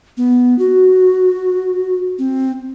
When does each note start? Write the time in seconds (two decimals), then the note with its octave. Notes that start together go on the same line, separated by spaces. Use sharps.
0.17 B3
0.59 F#4
2.19 C4